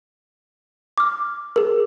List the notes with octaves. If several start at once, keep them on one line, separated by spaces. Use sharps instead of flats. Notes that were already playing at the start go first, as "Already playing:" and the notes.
D6 F6
G#4 A#4